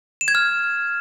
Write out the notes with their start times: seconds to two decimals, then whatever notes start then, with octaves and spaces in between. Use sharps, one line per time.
0.21 E7
0.28 G#6
0.35 F6